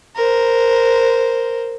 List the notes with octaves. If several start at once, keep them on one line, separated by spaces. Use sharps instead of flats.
A#4 C5